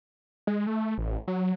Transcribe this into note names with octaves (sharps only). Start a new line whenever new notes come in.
G#3
A3
A1
F#3